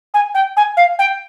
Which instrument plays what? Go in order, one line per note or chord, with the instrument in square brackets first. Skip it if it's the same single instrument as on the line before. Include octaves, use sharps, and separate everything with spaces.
[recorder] G#5
G5
G#5
F5
G5